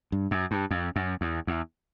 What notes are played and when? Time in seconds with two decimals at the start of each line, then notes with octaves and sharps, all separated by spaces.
0.12 G2
0.31 F#2
0.51 G2
0.71 F2
0.96 F#2
1.21 E2
1.47 E2